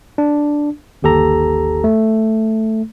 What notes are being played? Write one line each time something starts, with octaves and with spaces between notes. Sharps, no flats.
D4
G1 D#2 G4 A4 A#5
A3